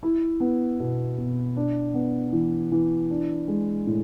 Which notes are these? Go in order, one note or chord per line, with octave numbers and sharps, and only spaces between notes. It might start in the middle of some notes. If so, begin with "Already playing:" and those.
E4
B3
B2
B2
D4
B3
E3
E3
D4
G#3
A2